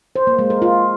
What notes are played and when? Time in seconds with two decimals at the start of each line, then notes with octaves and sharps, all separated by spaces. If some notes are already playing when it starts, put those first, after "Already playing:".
0.16 C5
0.27 A#3
0.39 G#3
0.50 A#4
0.62 F4